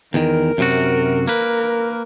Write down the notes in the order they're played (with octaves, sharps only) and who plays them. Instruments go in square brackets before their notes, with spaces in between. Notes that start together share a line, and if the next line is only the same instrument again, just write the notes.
[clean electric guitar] E2 D#3 [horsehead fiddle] A#4
[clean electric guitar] F#2 C3 F#4
[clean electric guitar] A#3 B4 [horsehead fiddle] A#4